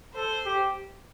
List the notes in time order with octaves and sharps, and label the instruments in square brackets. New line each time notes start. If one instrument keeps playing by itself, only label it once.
[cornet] A4 [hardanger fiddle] C5
[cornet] G4